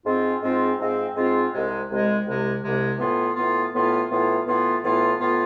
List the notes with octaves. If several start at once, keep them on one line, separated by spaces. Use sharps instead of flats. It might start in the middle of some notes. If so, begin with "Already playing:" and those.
G#2 G#3 C4 F4
G#2 G#3 C4 F4
G#2 G#3 C4 F4
G#2 G#3 C4 F4
C2 C3 G#3
C2 C3 G#3
C2 C3 G#3
C2 C3 G#3
A2 E3 B3 F4
A2 E3 B3 F4
A2 E3 B3 F4
A2 E3 B3 F4
A2 E3 B3 F4
A2 E3 B3 F4
A2 E3 B3 F4